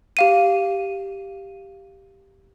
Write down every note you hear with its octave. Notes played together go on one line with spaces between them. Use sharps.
G4 F5 D#7